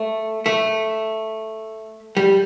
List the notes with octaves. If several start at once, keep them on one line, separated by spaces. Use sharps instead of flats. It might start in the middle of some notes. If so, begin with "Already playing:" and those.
Already playing: A3
A3
G3